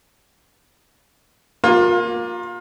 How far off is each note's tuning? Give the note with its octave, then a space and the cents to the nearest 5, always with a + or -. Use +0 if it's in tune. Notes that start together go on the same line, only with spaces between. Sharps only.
A#3 +5 F4 +30